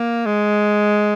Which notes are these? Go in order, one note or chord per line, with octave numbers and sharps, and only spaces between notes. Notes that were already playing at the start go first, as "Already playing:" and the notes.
Already playing: A#3
G#3